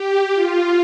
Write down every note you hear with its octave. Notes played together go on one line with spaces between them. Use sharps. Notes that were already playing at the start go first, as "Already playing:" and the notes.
Already playing: G4
F4